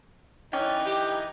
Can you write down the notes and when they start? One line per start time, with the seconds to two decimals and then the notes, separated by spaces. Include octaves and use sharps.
0.53 E3 C#4 D#4 D5 G5
0.86 G4